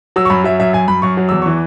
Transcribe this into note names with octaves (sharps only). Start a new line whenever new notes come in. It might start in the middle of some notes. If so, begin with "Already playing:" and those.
F#3 E6
C#6
F#2 B5
F#3 E5
F#2 E5
F#2 G#5
F#2 B5
F#2 C#6
F#3
E2 E6
E3 C#6